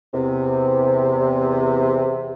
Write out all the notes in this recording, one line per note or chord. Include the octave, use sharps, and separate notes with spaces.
E2 C3